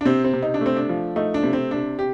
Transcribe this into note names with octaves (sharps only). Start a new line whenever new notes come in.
D4
C3 C4
C4
C3
D#4
D4
A3 C4
D4
F3
A3 D#4
D4
C3
C4
C3 D4
G4